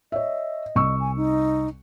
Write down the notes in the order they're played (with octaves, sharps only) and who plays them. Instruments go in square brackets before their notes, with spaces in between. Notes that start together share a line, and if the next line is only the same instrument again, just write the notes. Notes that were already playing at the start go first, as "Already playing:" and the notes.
[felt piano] C#5 E5 [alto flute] D#5
[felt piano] C2 C#6 E6
[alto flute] G#5
D#4